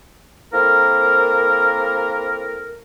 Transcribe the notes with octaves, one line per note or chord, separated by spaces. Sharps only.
A#3 C4 E4 A4 A#4